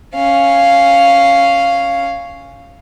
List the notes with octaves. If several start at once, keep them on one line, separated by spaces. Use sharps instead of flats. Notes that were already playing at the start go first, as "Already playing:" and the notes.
C#4 F5